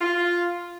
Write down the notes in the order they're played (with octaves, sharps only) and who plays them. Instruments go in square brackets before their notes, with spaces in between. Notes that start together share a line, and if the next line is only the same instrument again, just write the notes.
[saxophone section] F4